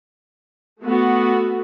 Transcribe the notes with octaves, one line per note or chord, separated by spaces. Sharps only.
A3 B3 F#4